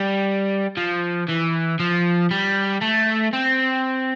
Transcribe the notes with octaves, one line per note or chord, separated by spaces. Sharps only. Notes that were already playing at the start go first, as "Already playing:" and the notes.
Already playing: G3
F3
E3
F3
G3
A3
C4